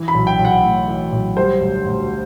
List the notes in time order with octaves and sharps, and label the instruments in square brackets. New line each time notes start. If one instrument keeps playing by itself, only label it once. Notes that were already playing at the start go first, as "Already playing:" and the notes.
Already playing: [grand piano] E3
B5
B1
G5
B1
F#5
A2
E3
B1
G3 C5
D2
D2